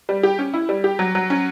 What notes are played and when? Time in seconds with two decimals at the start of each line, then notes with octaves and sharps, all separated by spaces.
0.09 G3
0.23 G4
0.39 C#4
0.54 E4
0.69 G3
0.84 G4
0.99 F#3
1.15 F#3
1.30 C#4